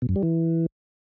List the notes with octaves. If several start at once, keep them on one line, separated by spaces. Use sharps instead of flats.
B2
F#2
G3
E3